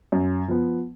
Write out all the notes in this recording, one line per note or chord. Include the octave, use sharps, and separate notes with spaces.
F#2
F3 B3